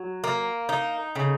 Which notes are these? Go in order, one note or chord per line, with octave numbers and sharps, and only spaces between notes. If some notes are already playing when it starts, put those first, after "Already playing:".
Already playing: F#3
A#3
D#4
C#3